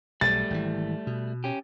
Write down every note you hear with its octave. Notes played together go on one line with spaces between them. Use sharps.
B1 G3 A3 A6
G#1 C3 E3
B2
C#4 G4